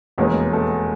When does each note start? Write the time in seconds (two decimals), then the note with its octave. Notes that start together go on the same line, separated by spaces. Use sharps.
0.18 F1 E2 B2 G#3 A#3 C#4 A#4
0.53 A3 A4